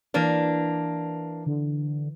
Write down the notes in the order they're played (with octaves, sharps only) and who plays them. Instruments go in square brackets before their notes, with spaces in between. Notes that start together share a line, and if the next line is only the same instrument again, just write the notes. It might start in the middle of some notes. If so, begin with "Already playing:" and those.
[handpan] E3 B4 [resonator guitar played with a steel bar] A#3 D4
[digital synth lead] D3